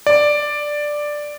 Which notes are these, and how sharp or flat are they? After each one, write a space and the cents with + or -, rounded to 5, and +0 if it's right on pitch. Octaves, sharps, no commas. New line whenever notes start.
D5 +5